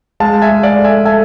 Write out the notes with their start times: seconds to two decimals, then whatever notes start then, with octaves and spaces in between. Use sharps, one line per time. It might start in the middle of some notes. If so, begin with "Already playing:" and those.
0.20 G#3 F5 A5
0.42 E5 G#5
0.49 G#3
0.63 D5 F5
0.78 A4
0.84 E5 G#5
1.05 A4 E5 G#5